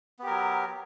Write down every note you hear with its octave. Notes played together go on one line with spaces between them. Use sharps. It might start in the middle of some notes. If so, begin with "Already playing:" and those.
F#3 B3 G4 A#4